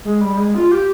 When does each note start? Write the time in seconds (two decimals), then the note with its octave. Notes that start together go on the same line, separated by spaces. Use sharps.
0.04 G#3
0.21 G3
0.37 G#3
0.55 F4
0.72 G4